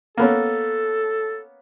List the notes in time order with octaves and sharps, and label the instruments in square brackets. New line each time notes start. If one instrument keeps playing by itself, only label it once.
[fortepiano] A#3 B3 C#4 [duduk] A4